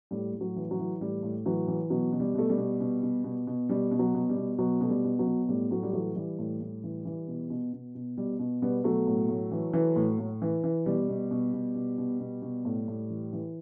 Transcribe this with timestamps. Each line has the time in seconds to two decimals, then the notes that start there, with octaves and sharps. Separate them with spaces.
0.11 A2 G3
0.34 A2
0.41 F#3
0.56 E3
0.71 F#3
0.79 E3
1.01 A2 G3
1.23 A2
1.46 E3 F#3
1.68 E3
1.90 B2 F#3
2.12 B2
2.20 G3
2.35 B2 A3
2.50 G3
2.58 B2
2.80 B2
3.03 B2
3.24 B2
3.47 B2
3.69 B2 G3
3.91 B2
3.99 F#3
4.14 B2
4.29 G3
4.37 B2
4.58 B2 F#3
4.81 B2 A3
4.89 G3
5.04 B2
5.19 F#3
5.26 B2
5.49 A2 G3
5.71 A2 F#3 A3
5.83 G3
5.93 E3 F#3 A3
6.15 E3 G3
6.39 A2
6.61 A2
6.84 E3
7.05 E3
7.28 B2
7.50 B2
7.73 B2
7.95 B2
8.17 B2 G3
8.39 B2
8.62 B2 G3 B3
8.84 B2 F#3 A3
9.07 A2
9.29 A2
9.51 E3
9.73 E3
9.96 A2
10.19 A2
10.42 E3
10.64 E3
10.86 B2 G3
11.09 B2
11.31 B2
11.53 B2
11.75 B2
11.98 B2
12.20 B2
12.42 B2
12.65 A2
12.88 A2
13.10 E3
13.33 E3